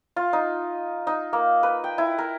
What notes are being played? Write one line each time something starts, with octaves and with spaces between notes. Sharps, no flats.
F4
D#4
D#4
A#3
B4
G5
E4
A#4